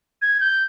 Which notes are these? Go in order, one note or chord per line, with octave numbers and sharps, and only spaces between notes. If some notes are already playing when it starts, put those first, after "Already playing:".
G#6
G6